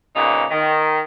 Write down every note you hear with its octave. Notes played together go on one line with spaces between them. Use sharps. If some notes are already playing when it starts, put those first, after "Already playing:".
A#2 C#3 B3 D#4
D#3